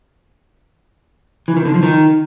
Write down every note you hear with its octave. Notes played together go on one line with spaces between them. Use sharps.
E3
D#3
D3
F3
D#3